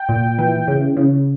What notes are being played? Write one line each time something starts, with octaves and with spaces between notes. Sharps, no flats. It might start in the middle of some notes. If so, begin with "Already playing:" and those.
Already playing: G5
A#2
E3
C#3
C#3